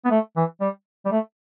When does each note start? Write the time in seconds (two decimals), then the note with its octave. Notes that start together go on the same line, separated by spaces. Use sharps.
0.05 B3
0.11 A3
0.36 E3
0.61 G3
1.05 G3
1.11 A3